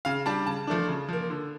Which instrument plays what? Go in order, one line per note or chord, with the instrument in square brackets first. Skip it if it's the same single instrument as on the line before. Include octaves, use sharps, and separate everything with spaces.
[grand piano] C#3 F5
G3 D4 A5
C#3 A5
F3 A3 D4
C#3
F3 A#3
D3